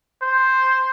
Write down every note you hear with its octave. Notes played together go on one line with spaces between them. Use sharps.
C5